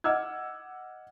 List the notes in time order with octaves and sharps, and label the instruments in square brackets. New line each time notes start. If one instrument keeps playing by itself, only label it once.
[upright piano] D#5 F#5 D6 E6 F6 G#6